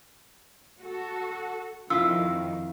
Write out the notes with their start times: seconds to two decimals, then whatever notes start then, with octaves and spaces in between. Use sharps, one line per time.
0.81 F#4 A4
1.90 F2 D#3 E4 F4 E6